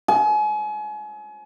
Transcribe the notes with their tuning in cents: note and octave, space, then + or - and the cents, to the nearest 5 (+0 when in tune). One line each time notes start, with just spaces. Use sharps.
G#5 +35